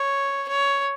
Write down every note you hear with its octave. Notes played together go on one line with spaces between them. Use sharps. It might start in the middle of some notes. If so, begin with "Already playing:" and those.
Already playing: C#5
C#5